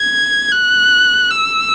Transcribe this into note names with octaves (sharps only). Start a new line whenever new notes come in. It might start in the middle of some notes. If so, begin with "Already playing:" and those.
Already playing: G#6
F#6
E6